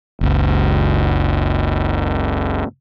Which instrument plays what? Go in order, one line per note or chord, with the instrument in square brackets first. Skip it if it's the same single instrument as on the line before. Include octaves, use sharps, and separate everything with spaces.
[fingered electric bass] F#1 C#2